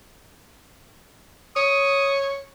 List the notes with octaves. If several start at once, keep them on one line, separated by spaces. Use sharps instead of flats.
C#5 D#6